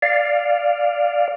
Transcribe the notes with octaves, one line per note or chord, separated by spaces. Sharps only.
D5 F5